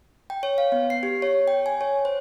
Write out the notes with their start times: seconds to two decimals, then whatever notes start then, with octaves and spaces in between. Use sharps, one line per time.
0.30 G5
0.43 C#5
0.58 F5
0.72 B3
0.90 C7
1.03 G4
1.22 C#5
1.48 G5
1.66 G#5
1.81 C#5
2.05 C5